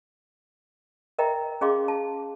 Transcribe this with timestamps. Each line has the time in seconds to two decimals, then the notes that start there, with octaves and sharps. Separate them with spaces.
1.19 A#4 D#5 E5 G5 A#5
1.61 C#4 G#4 D#5 F5 C6 D6
1.88 A5